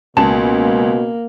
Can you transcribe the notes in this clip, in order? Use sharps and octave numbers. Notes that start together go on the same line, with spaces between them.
C#2 B2 A#3 A5